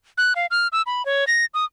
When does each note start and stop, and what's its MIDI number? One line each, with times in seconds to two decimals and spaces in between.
0.18 0.33 90
0.36 0.46 77
0.51 0.68 89
0.72 0.82 88
0.86 1.05 83
1.06 1.25 73
1.27 1.45 94
1.54 1.65 87